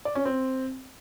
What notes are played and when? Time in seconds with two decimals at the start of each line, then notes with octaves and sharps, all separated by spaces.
0.05 D5
0.15 C#4
0.25 C4